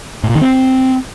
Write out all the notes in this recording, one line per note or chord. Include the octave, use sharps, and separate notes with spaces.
A2
A#2
D#3
C4